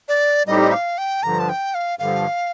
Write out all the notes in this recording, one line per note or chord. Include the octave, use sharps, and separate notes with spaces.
D5
A2 G3 C4 D#4 G4 D#5
F5
G5
G2 D3 F3 A#5
A5
G5
F5
G2 D3 F3 F5